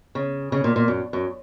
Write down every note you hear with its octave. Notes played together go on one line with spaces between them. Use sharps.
C#3
C#3
A#2
A#2
F#2
F#2